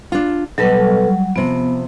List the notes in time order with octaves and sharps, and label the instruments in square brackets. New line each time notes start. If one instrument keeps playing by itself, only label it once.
[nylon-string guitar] D4 F4
[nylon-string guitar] B2 A4 D#5 [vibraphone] F#3 G3 F#5
[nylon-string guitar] C3 F3 [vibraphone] B3